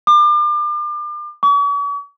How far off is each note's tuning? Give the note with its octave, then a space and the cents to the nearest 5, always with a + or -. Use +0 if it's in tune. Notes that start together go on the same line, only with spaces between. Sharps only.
D6 +35
C#6 +45